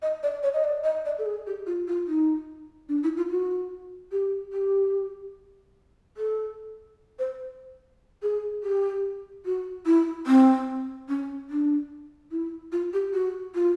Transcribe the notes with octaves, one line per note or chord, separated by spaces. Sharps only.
D#5
D5
C#5
D#5
D5
D#5
D5
A4
G#4
G4
F4
F4
D#4
D4
E4
F4
F#4
G4
G4
A4
C5
G#4
G4
F#4
E4
C4
C#4
D4
E4
F4
G4
F#4
F4